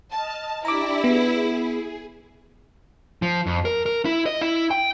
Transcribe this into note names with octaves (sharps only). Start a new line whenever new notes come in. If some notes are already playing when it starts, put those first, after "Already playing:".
D#5 A5 F6
D4 E4 G4 D5 A#5 D6
B3 G#4
F3
F2
A#4
A#4
E4
D#5
E4
G5